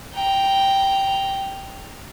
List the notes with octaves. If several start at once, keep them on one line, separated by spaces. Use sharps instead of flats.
G5 A#5